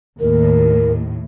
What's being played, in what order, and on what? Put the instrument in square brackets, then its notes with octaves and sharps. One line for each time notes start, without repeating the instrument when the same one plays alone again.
[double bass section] D#2 [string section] A2 [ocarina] A#4